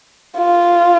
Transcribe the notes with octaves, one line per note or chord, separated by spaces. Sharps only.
F4